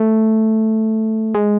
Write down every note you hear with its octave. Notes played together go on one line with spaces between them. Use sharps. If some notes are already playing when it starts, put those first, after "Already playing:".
Already playing: A3
G#3